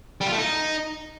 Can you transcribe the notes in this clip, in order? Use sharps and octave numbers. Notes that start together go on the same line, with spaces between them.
G3
F4
A3
D#4